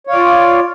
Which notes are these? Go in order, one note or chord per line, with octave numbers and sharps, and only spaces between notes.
F4 C#5 D5 F5